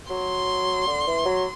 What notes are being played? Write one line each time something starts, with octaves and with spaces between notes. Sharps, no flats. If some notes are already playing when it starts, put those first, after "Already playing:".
F#3 C6
D3
E3
F#3